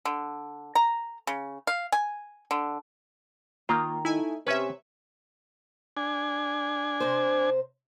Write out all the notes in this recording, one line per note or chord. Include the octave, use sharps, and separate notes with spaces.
D3
A#5
C#3
F5
G#5
D3
D#3 A#3 F4 A#5
A3 D#4 E4 G#5
C3 C#4 B4 C#5 E5 G#5
D4 G#5
C3 C5